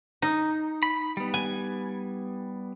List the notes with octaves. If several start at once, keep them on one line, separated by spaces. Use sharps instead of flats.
D#4
B5
G3 B3
G#5